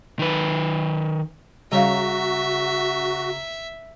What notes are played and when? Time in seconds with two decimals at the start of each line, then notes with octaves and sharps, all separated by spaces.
0.19 D#3 B4
1.72 C#3 G3 F#4 C#5 E5 F5 A#5